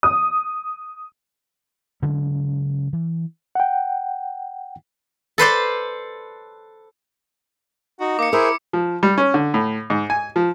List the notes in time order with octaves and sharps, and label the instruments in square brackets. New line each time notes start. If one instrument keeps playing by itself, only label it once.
[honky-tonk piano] D#6
[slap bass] C#3 F#3 G#3 C#4
E3
[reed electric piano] F#5 G5
[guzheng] A4 B4 C5 D5
[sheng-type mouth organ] D#4 [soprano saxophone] F#4
[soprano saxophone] A#3 [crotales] D6 C#7
[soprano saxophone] E4 [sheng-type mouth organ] G#4 C5 E5 [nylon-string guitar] A#4
[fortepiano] F3
G3
C#4
D3
A2
G#2
G#5
F3